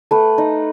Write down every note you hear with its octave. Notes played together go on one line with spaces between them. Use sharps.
A3 B4
D#4